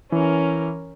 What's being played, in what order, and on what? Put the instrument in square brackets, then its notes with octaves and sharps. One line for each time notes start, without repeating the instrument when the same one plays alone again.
[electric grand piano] E3 [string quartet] C#4 A#4